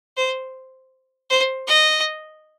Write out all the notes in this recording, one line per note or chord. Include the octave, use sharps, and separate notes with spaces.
C5
C5
D#5